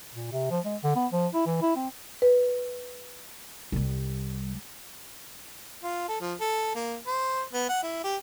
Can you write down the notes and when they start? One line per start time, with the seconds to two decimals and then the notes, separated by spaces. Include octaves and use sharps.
0.13 A#2
0.32 C3
0.50 F3
0.65 G#3
0.83 D3
0.96 B3
1.12 F3
1.34 E4
1.46 E3
1.62 E4
1.76 C4
2.22 B4
3.72 C2 G3
5.84 F4
6.08 A4
6.21 F3
6.41 A4
6.75 A#3
7.07 C5
7.53 B3
7.69 F#5
7.83 E4
8.04 G4